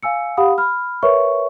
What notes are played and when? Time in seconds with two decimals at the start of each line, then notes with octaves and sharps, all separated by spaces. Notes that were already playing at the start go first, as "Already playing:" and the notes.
0.03 F5 G#5 E6 C#7
0.37 G4 F5 F#5 B5 D#6
0.58 B5 F6
1.03 A#4 B4 C#5 E5 C#6